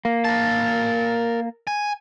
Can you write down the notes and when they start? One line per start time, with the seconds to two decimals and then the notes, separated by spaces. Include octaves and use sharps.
0.05 A#3
0.25 A#4 A5
1.67 G#5